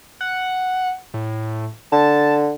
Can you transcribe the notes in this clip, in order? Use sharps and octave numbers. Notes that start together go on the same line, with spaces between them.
F#5
A2
D3 A5